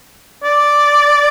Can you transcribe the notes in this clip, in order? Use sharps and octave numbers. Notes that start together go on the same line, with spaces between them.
D5